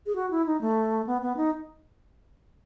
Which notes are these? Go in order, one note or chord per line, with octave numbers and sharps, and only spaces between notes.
G#4
F#4
E4
D#4
A3
B3
B3
D#4